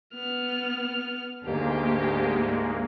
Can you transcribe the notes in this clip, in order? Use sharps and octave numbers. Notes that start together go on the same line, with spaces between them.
B3 F6
D2 G#2 G#3 A#3 G4